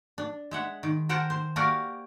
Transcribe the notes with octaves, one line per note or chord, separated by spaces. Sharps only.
D4
G#3 E5 F#5
D#3
A#4 C5 F#5 G5 A5 A#5
C5
A#3 F#4 G4 A#4 D5 F5